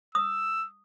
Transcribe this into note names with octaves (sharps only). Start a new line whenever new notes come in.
D#6 E6